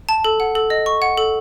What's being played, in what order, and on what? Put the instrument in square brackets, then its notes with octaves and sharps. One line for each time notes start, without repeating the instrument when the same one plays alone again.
[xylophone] A5
A4
F#5
A4
D#5
C#6
F#5
A4